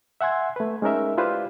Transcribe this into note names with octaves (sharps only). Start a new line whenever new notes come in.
E5 F#5 G#5 C6 G#6
A3 B4
G#3 C#4 D#4 A#4 E5
E4 F4 G4 B4 C5 D5